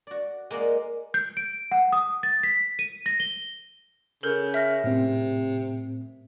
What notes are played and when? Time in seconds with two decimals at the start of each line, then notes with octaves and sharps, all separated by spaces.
0.07 F#4 D5
0.51 G#3 A#3 F#4 D5 D#5
1.14 G6
1.37 D7
1.72 F#5
1.92 D#6
2.23 A6
2.43 B6
2.79 D#7
3.06 A#6
3.20 G7
4.23 C#3 A4 A#4 G6
4.54 E5 F6 A#6
4.84 A2 C3 C4